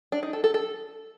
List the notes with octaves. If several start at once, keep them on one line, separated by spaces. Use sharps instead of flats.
D4
D#4
A4
A4
A4